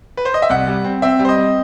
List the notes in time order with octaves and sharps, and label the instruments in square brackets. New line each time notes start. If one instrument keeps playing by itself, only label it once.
[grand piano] B4
C5
D#5
E5
C2 F#5
G3
C4
C4 E5
G3
C5
D#5
C4